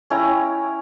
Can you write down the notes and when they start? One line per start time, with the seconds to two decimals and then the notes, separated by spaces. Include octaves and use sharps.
0.10 C#4 E4 G5 A#5